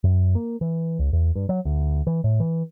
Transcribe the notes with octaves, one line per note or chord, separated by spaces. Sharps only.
F#2
A#3
E3
C#2
E2
G2
F#3
D2
E3
A2
E3